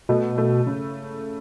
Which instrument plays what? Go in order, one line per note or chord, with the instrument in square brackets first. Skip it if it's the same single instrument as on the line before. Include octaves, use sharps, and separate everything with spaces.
[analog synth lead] B2 [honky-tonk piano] A3
[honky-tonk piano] A3
C#3